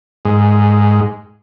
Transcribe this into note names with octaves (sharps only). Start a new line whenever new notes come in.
G#2